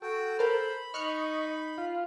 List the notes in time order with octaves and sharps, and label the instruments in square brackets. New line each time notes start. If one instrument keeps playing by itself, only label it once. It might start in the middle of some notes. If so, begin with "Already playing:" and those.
[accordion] F#4 G5 [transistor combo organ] A4
[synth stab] A#4 A5 F6 [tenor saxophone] C5 [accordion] B5
[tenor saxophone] D#4 [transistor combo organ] D#5 C#6 [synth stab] F6 F#6 C#7
[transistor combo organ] F4 F5